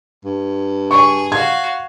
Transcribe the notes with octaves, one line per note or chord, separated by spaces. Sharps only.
G2
G#4 C#6
F#4 F5 G#6